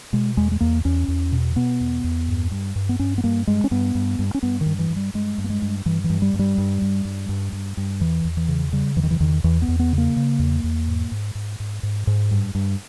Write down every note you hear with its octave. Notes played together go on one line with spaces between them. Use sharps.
B2 G#3
E2 G#3
G#3
E2 A#3
E2 C#4
E2
B2
B2 B3
E2
E2
G2
G2
G2
B3
G2 C#4
B3
G2 A#3
G2 G#3
C#4
G2 B3
G2
G2
C#4
G2 B3
D#3
G2
E3
G2
G3
G2 G#3
G2
A#3
G#3
G2
G2 E3
E3
G2
G3
G2
G3
G2
G2
G2
G2
G2
G2
E2 E3
E2
E3
C#3
C#3 G3
E2 E3
D#3
E3
E2 D#3
E2 E3
B3
E2
B3
C#3
A#3
C#3
E2
E2
G#2
G#2
G#2
G#2
G#2
G#2
G2
G2